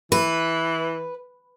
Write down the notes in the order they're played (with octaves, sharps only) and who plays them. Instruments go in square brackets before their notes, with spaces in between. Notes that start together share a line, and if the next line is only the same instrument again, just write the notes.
[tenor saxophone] E3 [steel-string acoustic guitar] B4